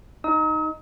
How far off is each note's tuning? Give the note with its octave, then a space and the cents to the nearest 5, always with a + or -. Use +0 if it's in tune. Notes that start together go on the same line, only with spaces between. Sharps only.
D#4 -5 D#6 +45